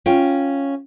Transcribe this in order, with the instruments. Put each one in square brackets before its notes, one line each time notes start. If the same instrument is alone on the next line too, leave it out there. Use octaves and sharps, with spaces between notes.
[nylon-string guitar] C#4 F4 G5